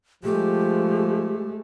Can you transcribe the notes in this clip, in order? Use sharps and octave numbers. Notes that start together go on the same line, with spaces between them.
F3 G#3 A3 G4